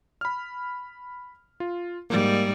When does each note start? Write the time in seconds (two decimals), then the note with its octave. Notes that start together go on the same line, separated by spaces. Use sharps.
0.21 B5 F6
1.60 F4
2.10 G#2 G3 A#3